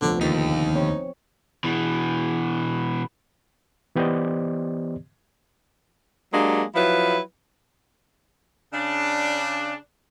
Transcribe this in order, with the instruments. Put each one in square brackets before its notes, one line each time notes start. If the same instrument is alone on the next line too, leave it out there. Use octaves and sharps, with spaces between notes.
[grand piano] F1 D2 A3 [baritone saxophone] D3 [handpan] F3 B3
[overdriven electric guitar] D#2 [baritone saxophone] D#4
[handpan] C4 C#5
[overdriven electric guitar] B2 E3
[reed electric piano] E3 B3 G4 C5 D5 D#5
[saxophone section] F#3 G#3 A#3 D4 G4
F3 F#3 E4 B4
[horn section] C#3 D4